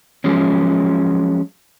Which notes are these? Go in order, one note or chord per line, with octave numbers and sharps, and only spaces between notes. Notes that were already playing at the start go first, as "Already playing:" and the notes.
F3 F#3 G#3 C#4